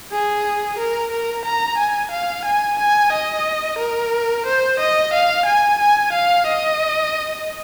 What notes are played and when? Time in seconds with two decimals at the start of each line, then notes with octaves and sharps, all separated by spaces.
0.12 G#4
0.79 A#4
1.11 A#4
1.45 A#5
1.78 G#5
2.11 F5
2.45 G#5
2.79 G#5
3.13 D#5
3.79 A#4
4.46 C5
4.79 D#5
5.13 F5
5.46 G#5
5.80 G#5
6.13 F5
6.47 D#5